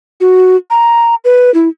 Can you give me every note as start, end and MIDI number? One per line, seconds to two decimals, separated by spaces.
0.21 0.56 66
0.70 1.15 82
1.25 1.53 71
1.54 1.68 64